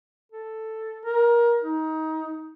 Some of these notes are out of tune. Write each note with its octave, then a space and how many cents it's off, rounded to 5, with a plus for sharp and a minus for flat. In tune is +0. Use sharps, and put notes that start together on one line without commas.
A4 +5
A#4 +20
D#4 +25